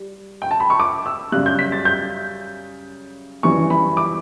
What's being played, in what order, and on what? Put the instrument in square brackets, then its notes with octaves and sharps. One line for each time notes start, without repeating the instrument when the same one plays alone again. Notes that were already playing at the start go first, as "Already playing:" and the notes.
Already playing: [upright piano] G3
G5
A5
B5
C#6
D6
E6
F#2 C#3 G3 F#6
G6
B6
A6
G6
F#2 E3 G3 C#6
B5
D6